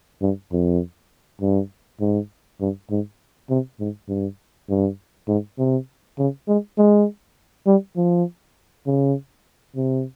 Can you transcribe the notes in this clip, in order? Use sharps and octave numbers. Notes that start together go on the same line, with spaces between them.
G2
F2
G2
G#2
G2
G#2
C3
G#2
G2
G2
G#2
C3
C#3
G#3
G#3
G3
F3
C#3
C3